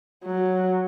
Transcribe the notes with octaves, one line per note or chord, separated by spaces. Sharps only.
F#3